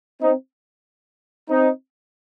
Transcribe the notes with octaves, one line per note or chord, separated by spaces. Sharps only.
C4 D#4
C4 D#4